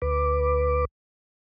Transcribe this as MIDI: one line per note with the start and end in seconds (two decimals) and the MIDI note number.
0.02 0.85 38
0.02 0.85 71
0.02 0.85 86